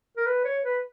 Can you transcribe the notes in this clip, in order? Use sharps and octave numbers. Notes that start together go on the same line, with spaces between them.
A#4
B4
C#5
B4